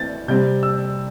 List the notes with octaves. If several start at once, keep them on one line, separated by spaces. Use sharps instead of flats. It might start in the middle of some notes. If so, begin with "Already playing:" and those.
Already playing: E3 A3 C4 E4 G6 A6
C3 G3 C4 G6
E6